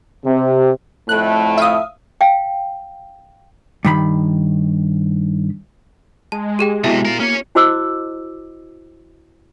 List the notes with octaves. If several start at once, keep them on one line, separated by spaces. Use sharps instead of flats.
C3
F2 A2 A3 F#6
E5 F5 D#6
F5 G5
G2 D#3 B5
G#3 A5
G4 G#4 G5
B1 C3 B3 E4 F#4 E5
F4 A#4
A#3 C#4 C#5
E4 F#4 C5 D#5 D6 E6